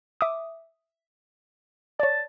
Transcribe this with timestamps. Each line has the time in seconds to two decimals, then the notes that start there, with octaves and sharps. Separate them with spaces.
0.21 E5 D6 D#6
2.00 C#5 D5 A5